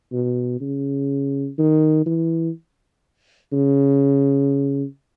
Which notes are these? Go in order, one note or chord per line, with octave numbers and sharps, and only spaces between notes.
B2
C#3
D#3
E3
C#3